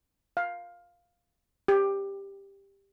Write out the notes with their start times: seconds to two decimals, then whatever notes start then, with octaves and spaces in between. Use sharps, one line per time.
0.37 F5
1.68 G4